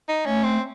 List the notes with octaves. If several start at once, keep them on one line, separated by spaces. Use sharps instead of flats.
D#4
A3 C#4
C4